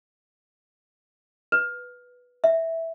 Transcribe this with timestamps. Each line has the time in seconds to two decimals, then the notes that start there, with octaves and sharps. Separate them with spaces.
1.52 B4
2.44 E5